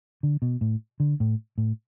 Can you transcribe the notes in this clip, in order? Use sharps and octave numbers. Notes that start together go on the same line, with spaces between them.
D3
B2
A2
D3
A2
A2